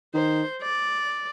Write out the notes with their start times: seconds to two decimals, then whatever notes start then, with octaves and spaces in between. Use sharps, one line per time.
0.14 D#3 C5
0.63 D5